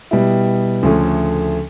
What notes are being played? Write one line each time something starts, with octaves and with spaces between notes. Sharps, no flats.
B2 G3 B3 E4 G4
D2 C#3 F3 A3 C#4